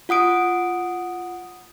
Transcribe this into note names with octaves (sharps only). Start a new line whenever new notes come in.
F4 F#5 D#6 D7